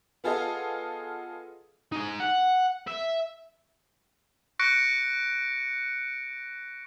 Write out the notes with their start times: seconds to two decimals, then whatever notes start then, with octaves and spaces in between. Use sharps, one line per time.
0.24 B3 F4 G#4 A4 D#5 F5
1.92 D#4 G#4
2.20 F#5
2.88 E5
4.59 C#6 F#6 A#6 C#7 D7